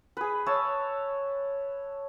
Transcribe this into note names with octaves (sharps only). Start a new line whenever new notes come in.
G#4 B4
C#5 E5 A5